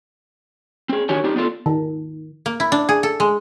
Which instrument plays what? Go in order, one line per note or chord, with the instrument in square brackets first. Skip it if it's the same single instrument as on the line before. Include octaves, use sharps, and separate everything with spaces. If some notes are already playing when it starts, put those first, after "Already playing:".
[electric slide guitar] C4 G#4
D#3 D4 F#4 G4 C#5 G#5
C4 D4 D#4 G4
B3 D4 F4 A4
[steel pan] D#3
[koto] A#3
E4
D4
G#4
A4
G#3